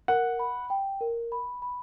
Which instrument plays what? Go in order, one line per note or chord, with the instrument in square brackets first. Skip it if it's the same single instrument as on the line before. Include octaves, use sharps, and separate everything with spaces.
[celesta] A#4 [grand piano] F#5
[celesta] B5
G5
A#4
B5
B5